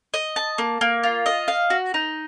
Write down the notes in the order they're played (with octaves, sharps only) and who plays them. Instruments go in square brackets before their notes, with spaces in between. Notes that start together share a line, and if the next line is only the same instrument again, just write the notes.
[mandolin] D#5
A5
A#3
A#3
F4
D#5
F5
F#4
D#4